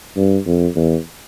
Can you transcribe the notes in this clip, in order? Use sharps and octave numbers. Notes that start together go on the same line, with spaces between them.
G2
F2
E2